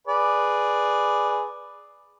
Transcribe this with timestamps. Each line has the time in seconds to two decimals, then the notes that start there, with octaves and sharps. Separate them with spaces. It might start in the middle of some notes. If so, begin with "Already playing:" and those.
0.07 G#4 B4 D5